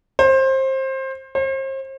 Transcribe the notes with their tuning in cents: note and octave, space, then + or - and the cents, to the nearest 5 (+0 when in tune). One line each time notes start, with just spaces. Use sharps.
C5 +25
C5 +40